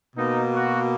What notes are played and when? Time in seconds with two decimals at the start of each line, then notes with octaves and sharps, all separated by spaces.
0.16 B2 A#3 D#4
0.53 F#4